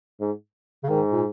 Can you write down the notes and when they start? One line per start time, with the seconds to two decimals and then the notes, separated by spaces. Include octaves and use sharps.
0.20 G#2
0.83 C#3
0.89 G#2 D#3
1.12 A#2